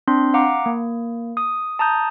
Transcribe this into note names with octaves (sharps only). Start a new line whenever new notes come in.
C4 D4 C6
F5 F#5 A#5 D6
A#3
D#6
A5 A#5 D#6 G6